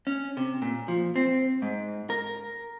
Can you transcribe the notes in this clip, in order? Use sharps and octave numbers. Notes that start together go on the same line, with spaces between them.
C#4
C3
A#2
F3
C4
G#2
A#4